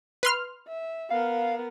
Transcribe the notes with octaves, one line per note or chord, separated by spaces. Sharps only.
B4 C6 F6
E5
B3 A#4 F5